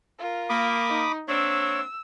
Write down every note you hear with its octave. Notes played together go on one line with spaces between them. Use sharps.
F4 A#4
A#3 B5 D6 D#6
D#4
A#3 C4 D4 C#5 E6